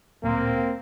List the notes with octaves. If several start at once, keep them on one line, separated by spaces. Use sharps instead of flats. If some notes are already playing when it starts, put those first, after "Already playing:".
D1 A#2 A#3 C4